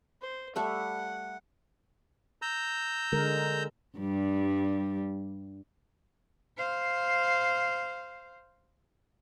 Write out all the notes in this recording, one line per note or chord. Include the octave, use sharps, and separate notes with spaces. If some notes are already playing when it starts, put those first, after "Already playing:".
C5
G3 A3 E5 F#5
A#5 E6 G6
D3 G#3 A#4
G2 G3
C5 F5